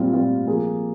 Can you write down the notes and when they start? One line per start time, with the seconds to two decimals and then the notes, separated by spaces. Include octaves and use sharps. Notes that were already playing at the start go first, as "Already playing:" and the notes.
Already playing: A#2 G3 C4 F4
0.13 A#2 G3 C4 F4
0.47 F3 A#3 F4 G#4